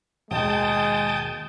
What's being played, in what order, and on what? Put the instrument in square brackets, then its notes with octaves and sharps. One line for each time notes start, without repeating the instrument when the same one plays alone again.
[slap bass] G#1 D#2 B2 [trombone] G#3 [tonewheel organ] G5 A5 [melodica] D#6